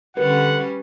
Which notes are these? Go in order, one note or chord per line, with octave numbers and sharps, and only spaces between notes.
D3 G3 C#4 B4 F#5